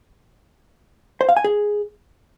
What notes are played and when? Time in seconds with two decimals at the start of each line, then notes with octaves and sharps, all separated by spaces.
1.21 C5
1.29 F5
1.37 G#5
1.44 G#4